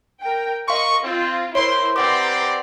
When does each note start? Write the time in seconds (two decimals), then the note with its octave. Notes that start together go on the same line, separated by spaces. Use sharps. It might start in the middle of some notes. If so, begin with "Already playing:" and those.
0.21 A#4 G5
0.68 A#4 D#5 F5 C6 C#6
1.04 C4 F4
1.55 E4 A#4 C5 C#5 C6
1.96 C4 G4 B4 D5 F#5 A#5 C6 D6